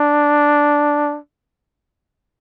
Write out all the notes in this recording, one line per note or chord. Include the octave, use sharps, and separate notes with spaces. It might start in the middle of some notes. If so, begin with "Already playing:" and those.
Already playing: D4